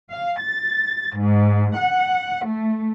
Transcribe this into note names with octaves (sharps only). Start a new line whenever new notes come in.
F5
A6
G#2
F#5
A3